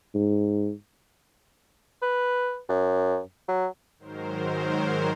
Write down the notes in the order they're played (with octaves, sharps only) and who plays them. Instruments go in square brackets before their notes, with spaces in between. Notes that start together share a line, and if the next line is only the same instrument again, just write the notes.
[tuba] G#2
[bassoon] B4
F#2
F#3
[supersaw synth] G#2 D#3 F#3 A#4 C5